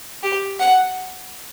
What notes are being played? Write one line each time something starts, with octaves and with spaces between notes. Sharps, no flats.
G4
F#5